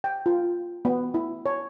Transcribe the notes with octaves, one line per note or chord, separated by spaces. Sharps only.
G5
F4
B3
E4
C#5